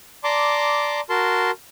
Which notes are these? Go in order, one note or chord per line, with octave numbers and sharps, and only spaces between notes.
D5 A5 A#5 C6 D6
F#4 A#4 A5 C6